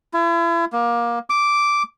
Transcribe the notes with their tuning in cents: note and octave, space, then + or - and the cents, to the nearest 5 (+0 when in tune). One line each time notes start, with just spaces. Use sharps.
E4 +40
A#3 +20
D6 -5